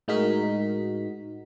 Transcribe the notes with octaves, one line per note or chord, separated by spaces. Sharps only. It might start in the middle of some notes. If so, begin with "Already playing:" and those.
A2 G#3 D#4 F#4 A#4 B6